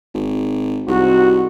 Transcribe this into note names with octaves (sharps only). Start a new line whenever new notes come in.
G#1
C2 G#2 C3 F#4